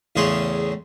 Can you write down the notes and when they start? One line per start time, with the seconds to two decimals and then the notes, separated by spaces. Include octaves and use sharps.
0.16 E2 A2 C#3 C#4 G#4 C6